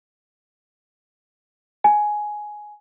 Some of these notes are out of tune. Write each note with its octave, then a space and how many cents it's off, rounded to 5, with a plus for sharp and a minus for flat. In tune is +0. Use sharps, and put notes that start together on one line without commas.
G#5 +10